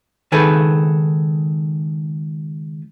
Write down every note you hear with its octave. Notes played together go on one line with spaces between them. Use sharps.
C#2 D#3 G#4 A4 B4